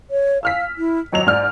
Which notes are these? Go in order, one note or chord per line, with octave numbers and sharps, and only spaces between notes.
C#5
F5 E6 F6 B6
E4
G#1 F#3 D#5 F7
G#2 D5 F6